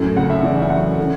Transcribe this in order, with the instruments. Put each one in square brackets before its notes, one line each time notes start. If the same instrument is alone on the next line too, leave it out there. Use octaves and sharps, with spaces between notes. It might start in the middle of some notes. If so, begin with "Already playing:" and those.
Already playing: [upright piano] F#2 A2
C#3 F#5
E5
E3 D5
E5
F#2 F#5
D3